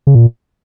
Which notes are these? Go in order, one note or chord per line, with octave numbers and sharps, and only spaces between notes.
C#3
A#2